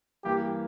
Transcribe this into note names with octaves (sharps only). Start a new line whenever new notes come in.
G2 E3 A#3 G4